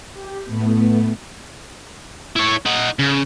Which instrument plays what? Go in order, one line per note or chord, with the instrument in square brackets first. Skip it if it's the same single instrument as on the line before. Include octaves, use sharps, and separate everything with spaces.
[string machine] G4
A2 A3 B3
[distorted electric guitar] E4 C#5
D#4 F#5
C#3